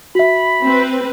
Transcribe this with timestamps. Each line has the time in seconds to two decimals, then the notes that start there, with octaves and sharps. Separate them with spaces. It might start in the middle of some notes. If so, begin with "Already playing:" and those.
0.15 F#4 E5 B5
0.63 C4 B4